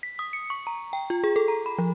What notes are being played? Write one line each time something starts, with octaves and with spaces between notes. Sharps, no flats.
B6
D#6
C#7
C#6
A#5
G5
F4
G#4
A4
A#5
B5
F3